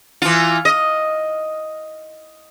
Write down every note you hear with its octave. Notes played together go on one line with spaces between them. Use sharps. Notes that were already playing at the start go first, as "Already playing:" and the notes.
E3 F4
D#5